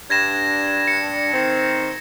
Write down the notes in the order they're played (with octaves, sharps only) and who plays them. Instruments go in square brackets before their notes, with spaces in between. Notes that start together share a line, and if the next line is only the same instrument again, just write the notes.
[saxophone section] G2 D4 [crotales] G#6 A#6 E7
[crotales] C#7
[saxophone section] D#3 C4